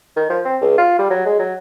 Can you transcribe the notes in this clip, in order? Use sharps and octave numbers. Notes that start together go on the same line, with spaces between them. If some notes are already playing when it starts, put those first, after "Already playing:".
D#3
F3
C4
C#2
F4
G3
F#3
G#3
F#3